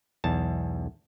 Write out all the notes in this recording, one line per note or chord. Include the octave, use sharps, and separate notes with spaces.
B1 E2 A5